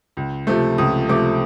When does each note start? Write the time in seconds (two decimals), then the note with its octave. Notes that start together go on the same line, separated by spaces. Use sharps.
0.17 C#2
0.47 C3 F3 A3
0.78 C#2 D#6
1.09 C3 F3 A3 D6